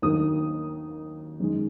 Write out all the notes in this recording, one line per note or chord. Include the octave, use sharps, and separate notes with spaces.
D#2 D#3 F#3 A#3 D4 D#6
F#2 D#3 G#3